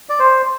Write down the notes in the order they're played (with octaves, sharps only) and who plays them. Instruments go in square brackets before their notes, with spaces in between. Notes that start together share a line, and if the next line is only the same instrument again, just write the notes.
[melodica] D5
C5